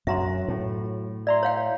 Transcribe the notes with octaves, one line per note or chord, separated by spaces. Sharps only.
F#2 F#3 F#4 E5 A#5 C6
A2
D5 E5 A#5 C6
C#5 F5 G5